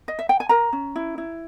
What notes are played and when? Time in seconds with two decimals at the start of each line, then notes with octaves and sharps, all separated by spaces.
0.08 D#5
0.19 E5
0.29 G5
0.40 G#5
0.49 A#4 A#5
0.73 C#4
0.96 E4
1.18 E4